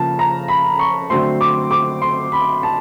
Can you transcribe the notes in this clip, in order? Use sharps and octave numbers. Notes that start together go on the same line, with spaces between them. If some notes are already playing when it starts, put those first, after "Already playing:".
Already playing: C#3 F3 A#3 A5
A#5
B5
C#6
D3 F#3 A3 C4 C6
D6
D6
C6
B5
A5